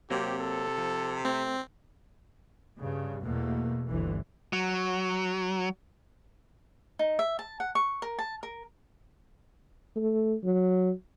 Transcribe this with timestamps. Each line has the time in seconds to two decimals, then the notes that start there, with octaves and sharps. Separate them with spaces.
0.10 C3 F#3 A#3 C4 G4
0.39 A4
0.78 F3
1.25 A3 C4
2.79 G2 C#3
3.22 E2 B2 A3 A#3
3.88 G1 D2 D3 E3
4.53 F#3
6.99 D#4
7.19 E5
7.39 A5
7.60 F#5
7.75 C#6
8.02 A#4
8.19 A5
8.43 A#4
9.96 A3
10.44 F#3